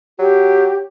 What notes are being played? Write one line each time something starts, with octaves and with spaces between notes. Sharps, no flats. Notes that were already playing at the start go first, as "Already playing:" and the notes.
F#3 G4